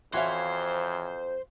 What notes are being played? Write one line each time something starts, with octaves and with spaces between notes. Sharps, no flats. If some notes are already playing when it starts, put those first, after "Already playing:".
F2 E3 C#4 F#4 C5 E5 F5